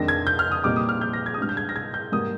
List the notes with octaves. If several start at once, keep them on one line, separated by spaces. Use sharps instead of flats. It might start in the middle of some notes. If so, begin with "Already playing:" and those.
Already playing: F2 D#3 G#3 D4 A#6
G#6
G6
F6
D#6
A#2 G3 C4 D#4 D6
D#6
F6
G6
A#6
G#6
D#6
G#2 G3 D4 F6
G6
G#6
A#6
G#6
G6
G#2 G3 A#3 D#6